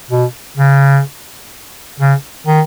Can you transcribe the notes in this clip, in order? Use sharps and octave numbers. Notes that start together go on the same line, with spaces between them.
B2
C#3
C#3
D#3